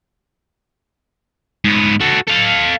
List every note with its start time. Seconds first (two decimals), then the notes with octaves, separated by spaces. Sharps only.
1.64 G#2 B3
2.00 F#4 A4
2.28 A4 F5